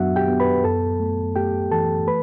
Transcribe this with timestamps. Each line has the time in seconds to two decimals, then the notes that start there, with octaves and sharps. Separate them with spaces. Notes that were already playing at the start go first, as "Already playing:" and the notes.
Already playing: F#2 F#3 B3 D4 F#4 E5 F#5
0.16 G4 G5
0.28 B3
0.40 B4 B5
0.64 F#2 A4 A5
1.00 A3
1.36 A3 G4 G5
1.72 E3 A4 A5
2.07 A3 B4 B5